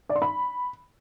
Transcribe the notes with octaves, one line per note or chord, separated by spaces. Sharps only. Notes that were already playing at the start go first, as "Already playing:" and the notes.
D5
C6
B5